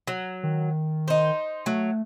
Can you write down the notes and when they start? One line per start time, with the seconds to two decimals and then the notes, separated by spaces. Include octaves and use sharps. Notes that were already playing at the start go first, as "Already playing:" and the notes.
0.07 F#3
0.43 D#3
1.08 D#4 C5
1.66 F#3 A3